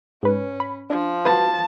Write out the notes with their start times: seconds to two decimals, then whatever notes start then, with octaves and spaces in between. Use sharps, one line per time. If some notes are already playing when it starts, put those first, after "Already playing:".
0.23 G#2 C#4 B4
0.60 B5
0.90 F3 D4
1.25 F#4 B4 A5